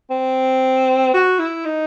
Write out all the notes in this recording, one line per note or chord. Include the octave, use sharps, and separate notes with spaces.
C4
F#4
E4
D#4